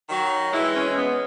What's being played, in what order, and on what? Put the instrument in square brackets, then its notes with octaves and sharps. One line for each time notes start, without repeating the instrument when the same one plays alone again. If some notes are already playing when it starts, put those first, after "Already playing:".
[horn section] D#3 F#3
[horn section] E3 G#3 [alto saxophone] E4
[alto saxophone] C#4
B3